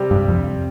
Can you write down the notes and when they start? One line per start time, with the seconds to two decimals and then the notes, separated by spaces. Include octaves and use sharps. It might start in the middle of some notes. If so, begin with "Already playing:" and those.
Already playing: C3 G3 C4 G4
0.11 G2
0.28 F2